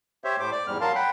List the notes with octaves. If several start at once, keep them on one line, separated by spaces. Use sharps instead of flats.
G4 C5 C#5 E5
A2 C5 D6
D5
E2 G#2 G3 F6
F#3 A#4 F5 A5 C6
F#5 G5 B5